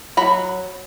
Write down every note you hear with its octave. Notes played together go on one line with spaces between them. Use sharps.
F#3 B5